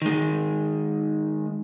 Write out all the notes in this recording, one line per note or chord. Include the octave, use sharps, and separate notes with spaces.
D#3 G#3